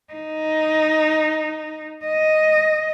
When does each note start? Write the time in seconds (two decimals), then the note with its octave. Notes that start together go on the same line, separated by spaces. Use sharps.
0.13 D#4
2.05 D#5